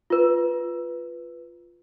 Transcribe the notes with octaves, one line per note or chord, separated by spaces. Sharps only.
F4 B4